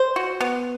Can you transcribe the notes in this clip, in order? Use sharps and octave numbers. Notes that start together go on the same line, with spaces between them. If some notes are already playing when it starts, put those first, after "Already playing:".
Already playing: C5
F#4
B3